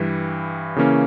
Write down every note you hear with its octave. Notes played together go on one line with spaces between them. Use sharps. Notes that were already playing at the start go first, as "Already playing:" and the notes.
Already playing: G2 E3 G3
C#3 E3 A#3 C#4